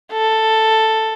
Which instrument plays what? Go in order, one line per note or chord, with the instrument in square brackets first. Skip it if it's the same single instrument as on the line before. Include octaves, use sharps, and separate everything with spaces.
[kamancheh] A4